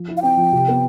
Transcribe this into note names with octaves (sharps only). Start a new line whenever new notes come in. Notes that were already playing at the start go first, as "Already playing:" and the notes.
Already playing: F3
E4
F5
C4 G5
F3
C3
B3